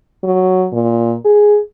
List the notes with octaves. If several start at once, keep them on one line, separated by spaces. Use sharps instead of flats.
F#3
A#2
G#4